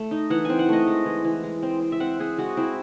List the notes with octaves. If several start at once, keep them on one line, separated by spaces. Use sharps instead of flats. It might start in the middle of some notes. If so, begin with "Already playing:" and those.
Already playing: A3
D#4
E3 F#5
C4 G#5
F#5
A3 D#5
G#3
E3
E3
G#3
C4
C4
E5
C4 F#5
C4 G#4
G#3 F#4
C4 E4